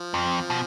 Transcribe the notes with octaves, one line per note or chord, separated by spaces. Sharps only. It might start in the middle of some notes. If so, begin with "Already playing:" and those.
Already playing: F3
F2
B2